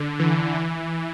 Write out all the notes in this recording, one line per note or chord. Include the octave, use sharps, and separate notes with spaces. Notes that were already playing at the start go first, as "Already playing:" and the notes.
Already playing: D3
E3
E3